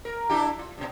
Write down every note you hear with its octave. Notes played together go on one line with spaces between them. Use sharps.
A#4
D4 E4 G4
F4
G2 B2